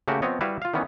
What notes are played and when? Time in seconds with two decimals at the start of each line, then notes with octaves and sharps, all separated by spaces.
0.08 C#3 A3 A#3 F#4 G4
0.22 F3 B3 C4 C#5 D#5
0.41 G3 E4 F#4 B4 E5 F5
0.62 F4 F5
0.74 D#3 E3 B3 C#4